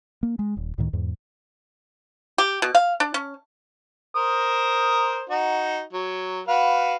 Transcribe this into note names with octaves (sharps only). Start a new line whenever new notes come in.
A#3
G#3
D#1
C#2 A2 D#3
E2 G#2
G4
B2
F5
D4
C#4
A#4 C5 D#6
D#4 F#4
F#3
F#4 B4 F5